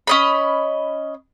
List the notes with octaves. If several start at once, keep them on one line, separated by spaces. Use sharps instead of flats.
C#4 D#5 B5